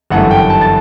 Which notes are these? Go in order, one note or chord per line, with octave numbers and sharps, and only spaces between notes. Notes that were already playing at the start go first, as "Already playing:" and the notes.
G1 F#2 E3 A3 F#5
G5
A5
A6